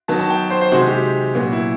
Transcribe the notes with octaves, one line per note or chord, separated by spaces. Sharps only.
D#3 F#3 B3 A5
A5
G5
C5
C5
C3 D#3 G#3 F#4
G4
A#2 F#3 B3
E4